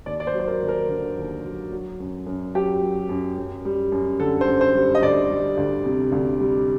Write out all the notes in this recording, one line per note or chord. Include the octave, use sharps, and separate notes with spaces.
D#2 D5
D5
C5
F#3
C5
A#4
D#2
A#4
D3
D#2
F#3
F#3
F#2
F#2
F#3 G4
F#3
F#2
F#2
G3
F#2
D3 A4
C5
F#2
C5
G3
D#5
D2 D5
G3
D2
C3
D2
G3